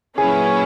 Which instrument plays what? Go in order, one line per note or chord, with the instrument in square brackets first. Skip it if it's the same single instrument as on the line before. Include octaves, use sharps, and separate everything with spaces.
[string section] A#2 F#3 C#4 E4 B4 [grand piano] G#4